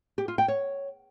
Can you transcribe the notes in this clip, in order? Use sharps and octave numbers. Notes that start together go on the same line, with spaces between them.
G4
F4
G5
C#5